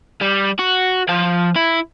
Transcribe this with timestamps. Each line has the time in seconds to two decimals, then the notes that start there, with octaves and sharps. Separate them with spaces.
0.22 G3
0.59 F#4
1.09 F3 F5
1.56 E4